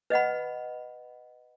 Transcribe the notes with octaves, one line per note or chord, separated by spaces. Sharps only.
B4 D#5 F#5 B5